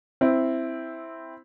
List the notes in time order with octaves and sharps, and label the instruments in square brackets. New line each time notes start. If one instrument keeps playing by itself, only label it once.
[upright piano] C4 E4